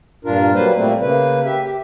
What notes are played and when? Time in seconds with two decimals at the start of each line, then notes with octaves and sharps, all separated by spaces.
0.25 G2 A#2 D4 F4 A#4
0.55 F#3 G3 A#3 B4 C5
0.77 A#2 G3 A3 A#3 C4
1.01 C#3 A#3 B4
1.45 G4 E5
1.64 G4